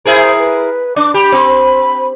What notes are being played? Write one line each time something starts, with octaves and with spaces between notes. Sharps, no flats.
E4 G#4 A#4 C5
B4
D4 D6
G4 B5
C4